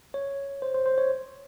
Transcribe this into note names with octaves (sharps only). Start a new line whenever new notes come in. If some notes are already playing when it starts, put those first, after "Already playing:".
C#5
C5
C5
C5
C#5